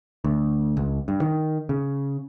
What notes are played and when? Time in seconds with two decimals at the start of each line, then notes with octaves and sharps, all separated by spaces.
0.24 D2
0.77 C#2
1.08 G2
1.22 D#3
1.69 C#3